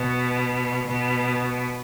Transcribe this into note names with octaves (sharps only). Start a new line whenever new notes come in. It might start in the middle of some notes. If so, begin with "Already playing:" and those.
Already playing: B2
B2